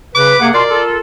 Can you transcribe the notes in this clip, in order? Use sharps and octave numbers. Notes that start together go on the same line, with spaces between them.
C#3 B4 D6
C3 A#3 G#4 F#5
B2 F4 A#4 D5 C6
F4 A4